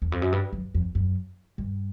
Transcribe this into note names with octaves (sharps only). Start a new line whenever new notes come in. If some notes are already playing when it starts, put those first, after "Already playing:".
E2
F2
F#2
G2
F#2
F2
F#2
G2